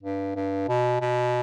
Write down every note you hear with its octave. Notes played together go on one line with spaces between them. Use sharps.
G2
G2
B2
B2